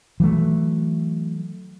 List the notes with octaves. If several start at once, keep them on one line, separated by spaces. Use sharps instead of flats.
E3 F#3 A3